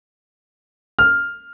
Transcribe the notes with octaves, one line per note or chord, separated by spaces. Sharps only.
F6